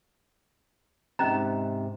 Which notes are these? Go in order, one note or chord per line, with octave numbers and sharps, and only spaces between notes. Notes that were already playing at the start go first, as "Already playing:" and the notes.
G#2 C3 C#4 D#5 A#5